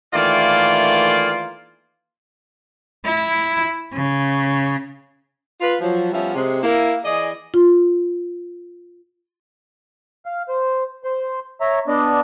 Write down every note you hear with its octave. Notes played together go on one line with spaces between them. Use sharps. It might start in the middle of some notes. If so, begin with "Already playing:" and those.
D#3 E3 A3 A#3 F4 D5
E4
C#3
F4 B4
F3 F#3
F3 G3 B3 C#4 E5 F5
C3 G#3
A#3 E4
E3 G#4 D5 D#5
F4
F5
C5
C5 C6
C#5 E5 A#5
B3 D4 D5 D#5